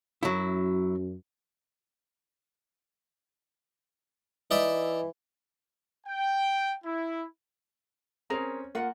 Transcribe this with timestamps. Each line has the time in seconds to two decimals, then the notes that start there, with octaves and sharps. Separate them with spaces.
0.23 F#2 F#3 E4
4.51 E3 D#4 D5 E5
6.07 G5
6.84 E4
8.30 C4 C#4 G#4 A#4 A#5
8.75 A#3 F4 F#5